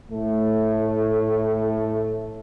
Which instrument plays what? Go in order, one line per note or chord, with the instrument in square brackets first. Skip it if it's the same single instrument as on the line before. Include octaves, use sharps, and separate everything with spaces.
[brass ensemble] A2 A3